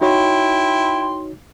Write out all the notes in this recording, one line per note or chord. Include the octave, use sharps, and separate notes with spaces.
D#4 E4 F#4 C#5 G5 C6